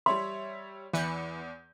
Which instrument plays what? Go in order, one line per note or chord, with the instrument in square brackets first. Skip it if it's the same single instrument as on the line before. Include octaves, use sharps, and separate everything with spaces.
[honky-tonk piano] G3 C#5 E5 [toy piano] C6
[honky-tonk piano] E2 G6 [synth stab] E3 B4 C#7